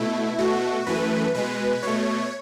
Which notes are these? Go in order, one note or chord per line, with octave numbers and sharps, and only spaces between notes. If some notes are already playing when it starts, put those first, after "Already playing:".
Already playing: B2 A3 E4
B2 A3 F#4
F#2 E3 A3 B4
B2 G#3 B4
B2 A3 C#5